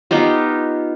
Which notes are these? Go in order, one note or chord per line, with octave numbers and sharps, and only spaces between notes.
B3 D#4 F4 G4